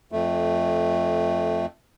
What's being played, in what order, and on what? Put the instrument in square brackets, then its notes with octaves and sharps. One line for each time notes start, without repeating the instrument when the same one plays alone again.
[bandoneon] F2 A3